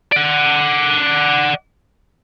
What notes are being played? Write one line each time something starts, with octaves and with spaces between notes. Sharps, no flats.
D5 F#5